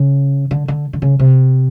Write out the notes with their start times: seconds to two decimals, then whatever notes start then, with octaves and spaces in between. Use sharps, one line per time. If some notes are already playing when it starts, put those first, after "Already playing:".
Already playing: C#3
0.51 D3
0.68 D3
0.93 D3
1.02 C#3
1.19 C3